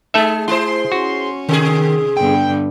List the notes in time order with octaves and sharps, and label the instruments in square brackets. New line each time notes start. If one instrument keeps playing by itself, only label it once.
[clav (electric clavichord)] A3 A4 E5 [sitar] D#4 G#4
[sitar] E4 G#4 C5 [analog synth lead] C6
[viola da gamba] C#4 [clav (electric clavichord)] F#4
[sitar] C3 G#4 [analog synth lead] D#3
[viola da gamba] G2 D3 B3 [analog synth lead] G5